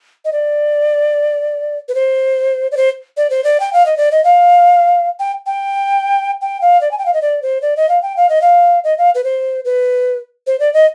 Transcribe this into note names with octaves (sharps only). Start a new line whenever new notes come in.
D#5
D5
B4
C5
D5
C5
D5
C5
D5
G5
F5
D#5
D5
D#5
F5
G5
G5
G5
F5
D5
G#5
G5
F5
D#5
D5
C5
D5
D#5
F5
G5
F5
D#5
F5
D#5
F5
B4
C5
B4
C5
D5
D#5